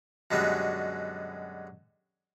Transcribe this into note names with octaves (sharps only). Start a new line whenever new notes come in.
F#2 B2 D3 G3 G#3 B3